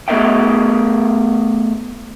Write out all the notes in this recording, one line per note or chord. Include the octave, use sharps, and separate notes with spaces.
A3 B3 A4 D#5 E5 G5